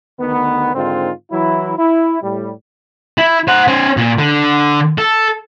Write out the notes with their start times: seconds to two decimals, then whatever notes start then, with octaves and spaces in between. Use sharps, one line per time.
0.20 D2 D#3 B3
0.75 G#2 D3 D#3 C4 F4
1.31 E3 F#3 E4
1.78 E4
2.21 A2 G3
3.18 E4
3.48 C5 F#5
3.68 C#4 C5
3.97 A#2
4.18 D3
4.98 A4